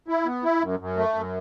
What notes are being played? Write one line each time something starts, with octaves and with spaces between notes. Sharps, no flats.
E4
B3
E4
F#2
F#2
A3
F#2